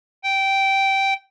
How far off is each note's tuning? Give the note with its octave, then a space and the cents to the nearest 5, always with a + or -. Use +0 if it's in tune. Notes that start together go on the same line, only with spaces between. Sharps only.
G5 -10